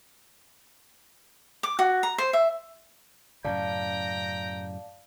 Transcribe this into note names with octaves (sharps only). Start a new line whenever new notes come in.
D6
F#4
A#5
C5
E5
F#2 A2 C#3 D5 F5 G5 A5 A#5